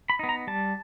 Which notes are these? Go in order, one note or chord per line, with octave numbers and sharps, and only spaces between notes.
B5
B3 D#4
A#5
G3 A5